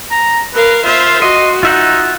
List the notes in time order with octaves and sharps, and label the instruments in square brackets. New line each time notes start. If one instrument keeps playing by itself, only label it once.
[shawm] A#5
[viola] A#4 F5 [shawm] B4
[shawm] F4 [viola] C5 E5
[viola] F#4 [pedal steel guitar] D#5 [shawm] C6
[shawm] D#4 [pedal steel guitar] F4 E5 F#5